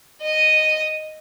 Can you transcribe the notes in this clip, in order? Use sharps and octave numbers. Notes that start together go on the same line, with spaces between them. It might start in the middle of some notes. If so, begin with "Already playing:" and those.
D#5